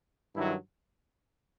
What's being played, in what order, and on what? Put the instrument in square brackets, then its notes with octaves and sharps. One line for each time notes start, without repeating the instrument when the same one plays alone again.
[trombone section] G2 D#3 F#3 E4